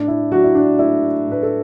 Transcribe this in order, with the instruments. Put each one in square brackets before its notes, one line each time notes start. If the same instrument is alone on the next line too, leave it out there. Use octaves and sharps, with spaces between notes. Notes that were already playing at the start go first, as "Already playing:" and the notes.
Already playing: [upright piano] A2 D4
E4
F#3 F#4
E4
D4
A3 E4
A2 B4
A4